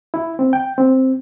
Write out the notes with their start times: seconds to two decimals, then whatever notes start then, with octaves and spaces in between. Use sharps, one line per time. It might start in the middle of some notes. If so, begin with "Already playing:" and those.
0.14 E4
0.39 C4
0.53 G5
0.78 C4